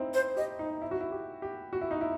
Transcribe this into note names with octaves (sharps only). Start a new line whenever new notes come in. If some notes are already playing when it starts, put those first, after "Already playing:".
Already playing: C4 D#4 E4
C5
G4 D#5
D#4
E4
F#4
E4
G4
G4
F#4
E4
D#4
E4